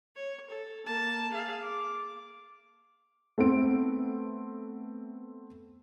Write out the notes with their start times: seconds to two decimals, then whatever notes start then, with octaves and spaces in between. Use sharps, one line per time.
0.16 C#5
0.50 A4
0.86 A#3 A5
1.31 G#4 F5
1.62 D6
3.38 A3 B3 C4 D7